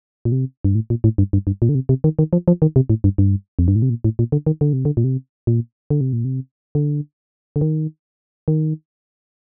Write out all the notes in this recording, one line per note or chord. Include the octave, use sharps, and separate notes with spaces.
A#2
C3
G2
A2
A#2
A2
G2
G2
G2
A#2
D3
C3
C3
D#3
D#3
F3
F3
D#3
C3
A2
G2
G2
F2
G2
A2
C3
A#2
A2
A#2
D3
D#3
D3
C3
D3
A#2
C3
A#2
D3
C3
A#2
C3
D3
D3
D#3
D#3